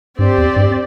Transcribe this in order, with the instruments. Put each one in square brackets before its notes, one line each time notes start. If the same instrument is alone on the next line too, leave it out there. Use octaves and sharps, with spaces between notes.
[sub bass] G2 [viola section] C4 G4 D5
[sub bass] E2
G2